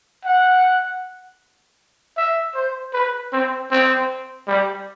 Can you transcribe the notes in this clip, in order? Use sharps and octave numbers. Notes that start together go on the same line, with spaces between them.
F#5
E5
C5
B4
C4
C4
G3